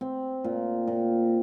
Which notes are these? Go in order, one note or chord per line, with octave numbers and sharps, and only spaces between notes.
C4
A#2
A#2